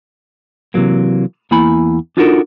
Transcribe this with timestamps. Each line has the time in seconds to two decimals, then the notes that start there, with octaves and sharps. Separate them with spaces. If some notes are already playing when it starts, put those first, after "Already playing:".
0.74 C3 E3 F#3 A#3
1.51 E2 A#3 E4 G#5 B5
2.17 D4 D#4 F4 F#4 A4 A#4